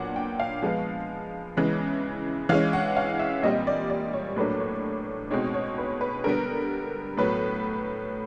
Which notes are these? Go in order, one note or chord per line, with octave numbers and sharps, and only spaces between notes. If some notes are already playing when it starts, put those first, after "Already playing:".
Already playing: A#2 F#3 B3 D4 F#5
G5
F5
F3 G#3 B3
C#3 E3 G#3 B3
E3 G#3 C#4 F5
F#5
F5
E5
A#2 G3 C4 D#5
D5
D5
C#5
A2 F#3 A#3 D4 B4
C#5
B2 G#3 C4 D#4 C#5
C#5
B4
B4
D3 G3 B3 A#4
A2 F#3 B3 B4